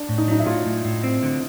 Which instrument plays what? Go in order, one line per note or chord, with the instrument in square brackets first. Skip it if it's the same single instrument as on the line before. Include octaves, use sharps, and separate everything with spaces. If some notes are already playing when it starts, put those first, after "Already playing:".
Already playing: [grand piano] D4
[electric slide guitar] A2
[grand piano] D#4
[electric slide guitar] F#3 [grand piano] D#4
[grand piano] E4
[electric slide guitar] A2 [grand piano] F4
[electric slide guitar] A2
A2
C4
D3